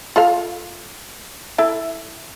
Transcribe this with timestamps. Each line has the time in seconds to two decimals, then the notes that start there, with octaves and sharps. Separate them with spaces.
0.16 F4 A4 F5
1.58 E4 A4